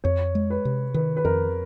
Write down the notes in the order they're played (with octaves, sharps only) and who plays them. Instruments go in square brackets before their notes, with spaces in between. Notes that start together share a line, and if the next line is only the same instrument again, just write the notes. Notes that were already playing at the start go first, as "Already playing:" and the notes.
[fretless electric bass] F2 [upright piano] C#5
[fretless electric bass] G#3
[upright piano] B4
[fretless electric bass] C3
[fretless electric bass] D#3 [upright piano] B4
[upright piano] B4
[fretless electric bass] F2 [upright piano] A#4